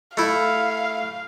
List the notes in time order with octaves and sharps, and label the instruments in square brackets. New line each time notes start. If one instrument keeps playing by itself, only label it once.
[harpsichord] A3 E4 [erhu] F5